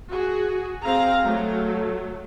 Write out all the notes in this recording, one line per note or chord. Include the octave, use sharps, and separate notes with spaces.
F#4 G#4
C4 G#4 F5 A#5
F#3 A3